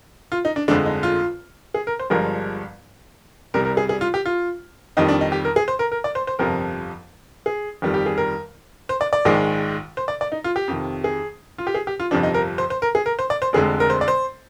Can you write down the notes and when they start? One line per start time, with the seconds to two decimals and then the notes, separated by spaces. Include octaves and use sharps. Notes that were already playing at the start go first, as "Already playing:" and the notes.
0.32 F4
0.45 D#4
0.56 D4
0.68 G1 F2 D3 G#3 D4
0.85 D#4
1.03 F4
1.74 G#4
1.87 A#4
1.99 C5
2.10 G1 G2 F3 G#3 A#4
3.54 C2 C3 G3 A#4
3.65 A#4
3.77 G#4
3.89 G#4
4.01 F4
4.14 G4
4.25 F4
4.97 F2 D#3 G3 D#4
5.08 D4
5.21 D#4
5.32 G4
5.45 A#4
5.56 G#4
5.68 C5
5.79 A#4
5.92 A#4
6.04 D5
6.15 C5
6.27 C5
6.39 G1 F2 C3 F3 A#4
7.46 G#4
7.82 G1 F2 D#3 G3
7.94 G4
8.06 G#4
8.18 A#4
8.89 C5
9.01 D5
9.13 D5
9.25 A#1 G#2 D#3 G#3
9.97 C5
10.08 D5
10.21 D5
10.32 D#4
10.44 F4
10.56 G4
10.68 F2 C3 D#3
11.04 G#4
11.58 F4
11.67 G4
11.75 G#4
11.87 G4
12.00 F4
12.11 G1 F2 C3 F3 D4
12.23 D#4
12.34 A#4
12.58 C5
12.70 C5
12.82 A#4
12.95 G#4
13.06 A#4
13.19 C5
13.30 D5
13.42 C5
13.53 F1 F2 D3 G#3 G#4
13.80 A#4
13.90 C5
14.01 D5
14.08 C5